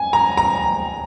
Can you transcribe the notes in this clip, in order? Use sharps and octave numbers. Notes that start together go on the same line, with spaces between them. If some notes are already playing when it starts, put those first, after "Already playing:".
Already playing: G#5
A#5
A#5